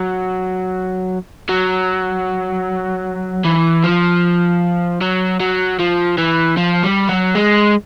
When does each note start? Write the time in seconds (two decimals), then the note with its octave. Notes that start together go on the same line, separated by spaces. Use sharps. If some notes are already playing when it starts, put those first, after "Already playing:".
Already playing: F#3
1.49 F#3
3.45 E3
3.84 F3
5.01 F#3
5.40 F#3
5.79 F3
6.18 E3
6.57 F3
6.83 G3
7.09 F#3
7.35 G#3